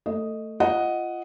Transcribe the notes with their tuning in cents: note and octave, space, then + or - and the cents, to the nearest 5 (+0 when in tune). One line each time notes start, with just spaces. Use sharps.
A3 +15 D#5 +0
F4 -20 D#5 +0 F#5 +0